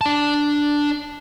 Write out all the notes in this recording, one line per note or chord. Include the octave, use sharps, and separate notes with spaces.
D4 A5